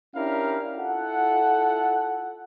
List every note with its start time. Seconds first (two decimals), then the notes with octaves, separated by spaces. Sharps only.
0.15 C#4 D4 E4 G4 A#4 F5
0.75 E4 F4 A4 F#5